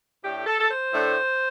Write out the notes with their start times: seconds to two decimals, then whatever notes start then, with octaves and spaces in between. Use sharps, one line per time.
0.23 A2 A3 D4 G4
0.46 A4
0.59 A4
0.70 C5
0.92 A2 A3 D4